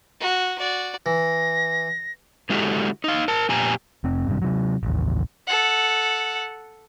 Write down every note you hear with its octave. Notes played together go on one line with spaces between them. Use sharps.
F#4
F#4 D5
E3 A#6
D3 G#3 E4 F#4 G4 A4
D#4 F5
A#4 A5
F2 A#2 G4 G#5 A#5
F1 C4
G#1 G2 C3
C3 F#3
A1 D#2
A4 F#5